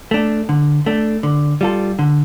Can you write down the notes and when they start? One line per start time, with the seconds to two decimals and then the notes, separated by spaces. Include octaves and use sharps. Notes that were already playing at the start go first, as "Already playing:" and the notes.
0.11 A3 D4
0.49 D3
0.86 A3 D4
1.23 D3
1.61 G3 F4 A4
1.99 D3